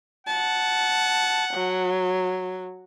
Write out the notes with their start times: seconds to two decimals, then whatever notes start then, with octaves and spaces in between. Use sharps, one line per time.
0.27 F#5 A5
1.53 F#3